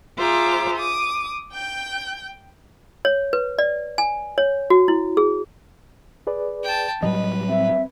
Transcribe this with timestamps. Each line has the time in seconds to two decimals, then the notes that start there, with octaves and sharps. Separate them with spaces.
0.17 F4 G#4 C5 E5 A#5 D6
0.76 D6 D#6
1.52 G5 G6
3.05 C#5
3.33 B4
3.59 D5
3.98 G#5
4.38 C#5
4.70 F#4
4.88 E4
5.17 G#4
6.27 G#4 B4 D5
6.63 G5 A5
7.03 A2 F#3 G3 B4 D#5
7.49 C4 E5